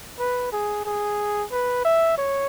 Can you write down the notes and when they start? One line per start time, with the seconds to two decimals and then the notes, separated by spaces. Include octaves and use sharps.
0.19 B4
0.52 G#4
0.85 G#4
1.52 B4
1.85 E5
2.18 C#5